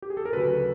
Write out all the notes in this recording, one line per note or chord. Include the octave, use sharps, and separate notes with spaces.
G4
G#4
A4
A#4
D2 C#3 F#3 A4 B4